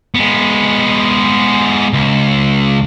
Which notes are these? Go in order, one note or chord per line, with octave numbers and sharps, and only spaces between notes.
G#3 B3
C#2